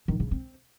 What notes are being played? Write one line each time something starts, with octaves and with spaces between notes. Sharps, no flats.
D#3
C#3
C4